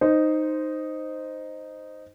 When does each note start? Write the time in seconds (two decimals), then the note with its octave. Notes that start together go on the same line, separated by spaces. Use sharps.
0.01 D#4 C5